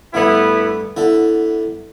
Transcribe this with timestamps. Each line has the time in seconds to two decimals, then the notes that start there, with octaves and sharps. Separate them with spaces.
0.14 G2 D3 A3 B3 D4 E4
0.97 D3 B3 E4 A4